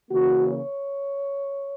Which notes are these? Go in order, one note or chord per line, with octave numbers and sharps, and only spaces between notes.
C#3 E3 A#3 F#4
C#5